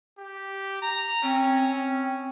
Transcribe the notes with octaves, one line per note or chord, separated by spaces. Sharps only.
G4
A#5
C4 C#4